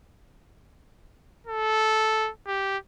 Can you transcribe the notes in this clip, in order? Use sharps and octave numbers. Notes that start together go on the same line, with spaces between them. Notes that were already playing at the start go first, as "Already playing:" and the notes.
A4
G4